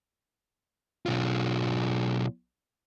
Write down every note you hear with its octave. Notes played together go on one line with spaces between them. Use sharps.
B1 F4